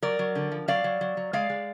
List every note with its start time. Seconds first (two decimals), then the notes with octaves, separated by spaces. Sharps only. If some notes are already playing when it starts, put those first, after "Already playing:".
0.02 F#3 A#4 D5
0.19 F#3
0.35 D3
0.52 F3
0.68 F#3 D5 F5
0.84 F#3
1.01 F#3
1.17 F#3
1.33 G#3 D5 F5
1.50 G#3